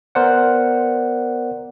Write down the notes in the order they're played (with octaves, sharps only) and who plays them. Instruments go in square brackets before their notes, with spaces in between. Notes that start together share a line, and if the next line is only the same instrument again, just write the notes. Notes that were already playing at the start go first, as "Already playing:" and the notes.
[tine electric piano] B3 A#4 C5 D5 F#5